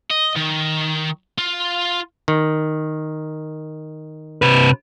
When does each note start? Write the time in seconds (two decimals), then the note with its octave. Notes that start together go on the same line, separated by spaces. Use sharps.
0.11 D#5
0.36 D#3
1.38 F4
2.28 D#3
4.42 C3 B4